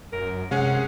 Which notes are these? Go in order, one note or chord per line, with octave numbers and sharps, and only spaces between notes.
F#2 A#4
C3 G#3 C#4 G#4 F#5